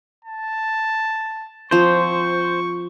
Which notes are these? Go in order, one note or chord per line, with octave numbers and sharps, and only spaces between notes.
A5
F3 C4 C5 C#6